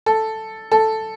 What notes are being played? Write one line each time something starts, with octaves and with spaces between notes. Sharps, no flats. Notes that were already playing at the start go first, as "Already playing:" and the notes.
A4
A4